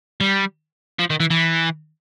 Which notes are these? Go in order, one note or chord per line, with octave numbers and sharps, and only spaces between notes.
G3
F3
D#3
E3
E3